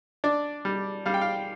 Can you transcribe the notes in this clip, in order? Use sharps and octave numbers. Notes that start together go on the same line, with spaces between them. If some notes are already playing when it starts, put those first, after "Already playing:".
D4 D5
G3
G3 F5
G5
F5